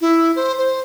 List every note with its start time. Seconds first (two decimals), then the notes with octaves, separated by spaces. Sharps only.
0.01 E4
0.36 C5
0.58 C5